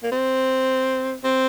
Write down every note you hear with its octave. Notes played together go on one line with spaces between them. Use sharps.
A#3
C4
C4